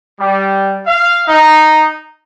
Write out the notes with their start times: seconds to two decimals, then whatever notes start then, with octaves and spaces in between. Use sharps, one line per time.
0.20 G3
0.86 F5
1.28 D#4